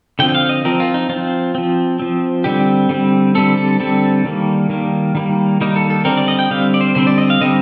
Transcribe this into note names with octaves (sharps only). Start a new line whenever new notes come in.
D3 F3 C4 G5
G5
F5
D#5
F3 C4 A#4
F4
D#4
F3 C4 F4
F3 C4
F3 C4
D3 G3 C4 G4
D3 G3 C4
D3 G3 C4 A4
A4
D3 G3 C4 A4
D#3 G3 A#3
D#3 G3 A#3
D#3 G3 A#3
D#3 G3 A#3 D#4
A4
A4
D3 G3 C4 A#4
D5
D#5
G5
D3 G3 C4 F5
D5
C5
D3 G3 C4 C5
D5
D#5
F5
D3 G3 C4 D#5